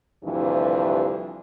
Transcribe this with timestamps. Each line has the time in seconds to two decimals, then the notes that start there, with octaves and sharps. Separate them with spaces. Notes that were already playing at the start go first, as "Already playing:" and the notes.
0.24 D2 G2 C3 E3 F3